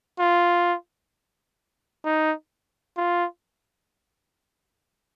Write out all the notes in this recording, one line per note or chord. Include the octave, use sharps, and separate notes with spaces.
F4
D#4
F4